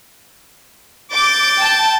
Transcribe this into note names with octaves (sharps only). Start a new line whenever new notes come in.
D6 G6 A6
G5 A5